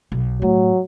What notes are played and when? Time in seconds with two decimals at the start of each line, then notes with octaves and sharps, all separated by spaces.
0.12 B1
0.42 A2 F#3